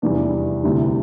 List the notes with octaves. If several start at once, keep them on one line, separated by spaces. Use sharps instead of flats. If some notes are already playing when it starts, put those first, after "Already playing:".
F1 E2 E3 G3 D4
D2 C3 G3 E4